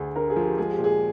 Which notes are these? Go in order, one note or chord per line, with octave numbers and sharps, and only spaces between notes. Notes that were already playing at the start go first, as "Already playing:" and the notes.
Already playing: D2 D3 G#4
D3 A#4
G#4
F3
G4
G#3 G#4
G4
A#2
G#4